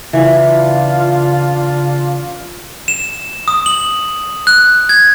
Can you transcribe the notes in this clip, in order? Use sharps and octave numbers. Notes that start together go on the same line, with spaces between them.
C#3 E3 D4 F4
E7
D#6
F#7
F#6
G#6